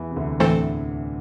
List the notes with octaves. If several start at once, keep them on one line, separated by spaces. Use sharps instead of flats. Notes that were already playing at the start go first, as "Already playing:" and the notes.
Already playing: E2 E3
C3
D2 D3
A2 E3 A3 C4 A4 C5